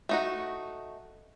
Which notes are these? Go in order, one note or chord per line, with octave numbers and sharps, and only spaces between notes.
A3 D#4 F#4